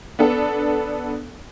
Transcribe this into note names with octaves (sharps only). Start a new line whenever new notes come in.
B3 D4 A4